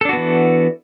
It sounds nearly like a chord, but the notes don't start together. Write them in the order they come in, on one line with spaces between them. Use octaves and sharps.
A4 D4 F#4 B3 E3